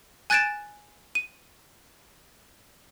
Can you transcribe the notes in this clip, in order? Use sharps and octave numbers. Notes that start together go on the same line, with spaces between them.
G#5 F#6 G#6 A6 D7 E7
D#7